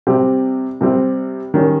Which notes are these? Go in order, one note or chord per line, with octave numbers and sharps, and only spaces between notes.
C3 G3 C4 G4
C3 G3 C4 G4
D#3 G3 C#4